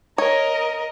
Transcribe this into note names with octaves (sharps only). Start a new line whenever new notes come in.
A#4 C#5 D#5